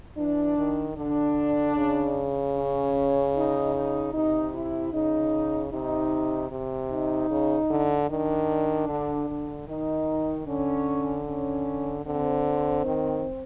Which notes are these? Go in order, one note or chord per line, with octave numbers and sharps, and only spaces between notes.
E3 D4
D#3
D3 D4
C#3
C#4
D#4
D#4
C3 D#4
E4
C#3 D#4
C3 D#4
C3
D#4
C#3
D3
D#3 D4
D3
D3
D#3 D#4
D3 C#4
C#4
D3 C4
D#3